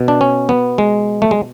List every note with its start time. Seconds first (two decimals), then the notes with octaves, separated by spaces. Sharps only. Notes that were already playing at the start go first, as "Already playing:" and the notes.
Already playing: B2
0.08 D4
0.21 C#4
0.49 B3
0.78 G#3
1.22 A3
1.31 G#3